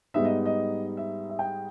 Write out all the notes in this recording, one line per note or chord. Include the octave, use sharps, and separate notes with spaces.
G#2 G3 B3 D#4 E5
D#5
D#5
E5
E5
G5